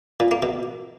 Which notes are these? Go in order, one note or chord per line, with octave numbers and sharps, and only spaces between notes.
A#2
A#3
B2